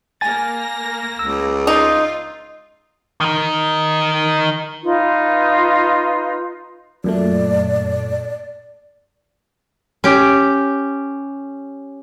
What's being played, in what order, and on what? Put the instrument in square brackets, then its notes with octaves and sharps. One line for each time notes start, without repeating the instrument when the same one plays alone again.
[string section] A#3 A#6 [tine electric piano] G#5 A6
[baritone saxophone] C#2 [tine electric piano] E6
[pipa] D#4 [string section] F4
[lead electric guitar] D#3 D#4
[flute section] D#4 F4 B4
[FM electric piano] F#2 A#2 A3 [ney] D5
[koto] C#4 G4